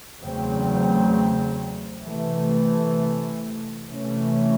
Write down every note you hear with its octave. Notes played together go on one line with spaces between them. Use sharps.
E2 C#3 F#3 A3 C4
C3 E3 A3
C3 E3 A3 C#4